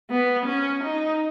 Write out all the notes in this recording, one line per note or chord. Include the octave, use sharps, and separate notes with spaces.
B3
C#4
D#4